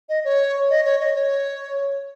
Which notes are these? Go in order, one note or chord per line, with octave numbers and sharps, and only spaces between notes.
D#5
C#5
D#5
C#5
D#5
C#5